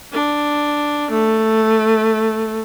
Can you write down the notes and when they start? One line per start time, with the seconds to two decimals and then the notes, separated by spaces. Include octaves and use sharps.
0.12 D4
1.10 A3